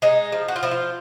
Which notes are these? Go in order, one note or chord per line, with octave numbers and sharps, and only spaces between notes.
G#3 D#4
F3
F#4
F4
F3 E4
F4